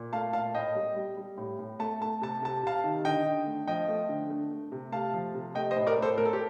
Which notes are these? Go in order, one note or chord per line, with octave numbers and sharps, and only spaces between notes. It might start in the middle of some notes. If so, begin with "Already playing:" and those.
Already playing: A#2
A3 F5 A5
A#2 F5 A5
A2 D#5 G5
G3
G3
G3
A2
A2
A3 A5
A3 A5
C3 A5
C3 A5
C3 F5 A5
D#3
D3 D#5 G5
D3
A3
F3 D#5 G5
A3
D3
A3
A3
C3
A3 F5 A5
F3
C3
A3 D#5 G5
C5 D#5
A2
A#4 D5
A2
A4 C5
A3 A#4
A4
G4